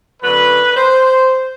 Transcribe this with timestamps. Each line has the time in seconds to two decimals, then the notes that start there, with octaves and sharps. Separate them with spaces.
0.22 F#2 D3 F#3 B4
0.76 C5